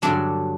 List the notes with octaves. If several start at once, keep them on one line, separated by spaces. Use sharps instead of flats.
G2 D3 F#3 D4